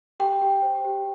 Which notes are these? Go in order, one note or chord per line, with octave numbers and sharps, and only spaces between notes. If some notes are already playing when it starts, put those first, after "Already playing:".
G4 G5
G4
C5
G4